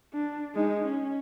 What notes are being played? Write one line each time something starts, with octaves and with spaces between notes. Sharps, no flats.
D4
G#3 D#4
C#4